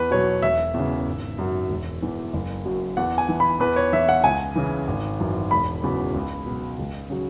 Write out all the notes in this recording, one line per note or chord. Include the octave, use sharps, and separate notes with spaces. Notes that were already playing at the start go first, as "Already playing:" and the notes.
Already playing: E2 B4
B2 F#3 C#5
E1 E5
E2 C#3
G#1
F#2 F#3
E1
E2 E3
F#1
F#2 F#3
E2 F#5
G#5
E3
B5
E2 B4
C#5
E3 E5
F#5
C#2 G#5
C#3 E3
G#1
F#2 E3
E1 B5
E2 C#3 F#3
C#2
B2 F#3
C#2
C#3 F#3